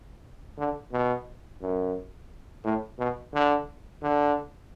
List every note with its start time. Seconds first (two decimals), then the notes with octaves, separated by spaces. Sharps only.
0.58 D3
0.93 B2
1.62 F#2
2.64 A2
2.99 B2
3.34 D3
4.03 D3